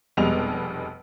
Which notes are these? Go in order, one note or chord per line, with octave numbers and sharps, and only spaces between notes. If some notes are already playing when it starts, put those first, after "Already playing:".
F1 B2 G3 G#3 F7